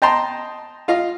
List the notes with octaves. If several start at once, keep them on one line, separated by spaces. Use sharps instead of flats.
D#5 G5 A5 A#5 C6
F4 D#5 F5